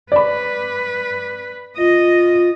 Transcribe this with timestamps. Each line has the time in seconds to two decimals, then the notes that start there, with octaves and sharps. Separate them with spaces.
0.12 B4 D5 B5
1.78 F4 D#5